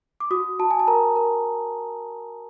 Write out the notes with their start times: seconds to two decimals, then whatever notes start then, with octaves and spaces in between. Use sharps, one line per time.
0.20 D6
0.31 F#4 D#6
0.60 F#4 A5
0.71 G#5
0.79 A5
0.87 A#4 A#5
1.16 A#4